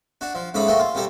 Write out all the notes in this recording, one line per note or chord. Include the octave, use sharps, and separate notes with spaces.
D4 F#4
F3
G#2 C#3 A3 B5 D6
A#2 A3 F#4 G5
F4
C2 G3 G4 A4 A#5